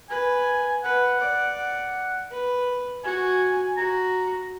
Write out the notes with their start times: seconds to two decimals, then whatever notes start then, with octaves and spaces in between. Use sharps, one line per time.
0.10 B4 G#5
0.84 B4 F#5
1.20 D5
1.58 F#5
2.31 B4
3.04 F#4 G#5
3.77 F#4 A#5